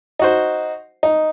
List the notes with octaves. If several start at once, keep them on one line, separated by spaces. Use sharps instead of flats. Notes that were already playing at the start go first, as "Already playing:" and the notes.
D#4 F#4 C5
D#4